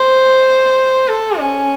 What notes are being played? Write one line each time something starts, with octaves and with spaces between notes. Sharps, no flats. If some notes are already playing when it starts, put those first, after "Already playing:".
Already playing: C5
A4
C#4